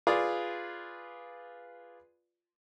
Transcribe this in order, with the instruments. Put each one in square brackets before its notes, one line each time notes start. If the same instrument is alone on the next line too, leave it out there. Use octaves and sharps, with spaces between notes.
[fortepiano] F4 G#4 B4 D5